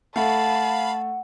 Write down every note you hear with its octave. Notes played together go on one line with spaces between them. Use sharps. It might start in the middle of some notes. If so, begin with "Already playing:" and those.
A3 F5 F#5 A5 B5